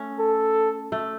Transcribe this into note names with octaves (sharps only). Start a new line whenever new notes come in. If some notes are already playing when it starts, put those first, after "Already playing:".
Already playing: A3 C#4
A4
A3